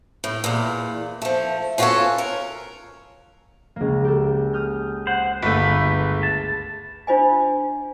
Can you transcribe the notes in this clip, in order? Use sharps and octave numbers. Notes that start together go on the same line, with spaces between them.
A2
E2 A#2
F3 A3
C#4 F4 F#4 G#4 A4 C#5
A#4
C#2 A#3
G4 A4
D#6 F6 G6
C5 F#5
G1 A3 B4
A5
D4 F4 C5 D#5 G#5